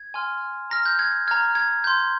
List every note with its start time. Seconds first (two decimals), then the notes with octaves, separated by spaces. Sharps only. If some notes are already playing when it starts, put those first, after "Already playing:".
Already playing: G#6
0.14 G#5 C6 F6
0.70 A#5 F6 A#6
0.86 G6
0.99 G#6
1.28 A#5 F6 G#6
1.55 G#6
1.84 C6 G6